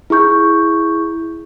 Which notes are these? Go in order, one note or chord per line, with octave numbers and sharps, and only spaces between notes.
E4 G#4 C#6 G6